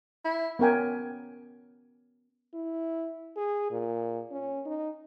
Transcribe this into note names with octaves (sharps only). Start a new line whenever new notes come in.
E4
B3 C#4 A#4 G5 G#5
E4
G#4
A#2
C#4
D#4